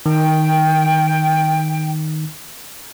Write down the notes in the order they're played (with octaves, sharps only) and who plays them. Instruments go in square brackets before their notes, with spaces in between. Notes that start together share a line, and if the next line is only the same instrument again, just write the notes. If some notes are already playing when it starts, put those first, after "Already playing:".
[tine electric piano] D#3 [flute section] G5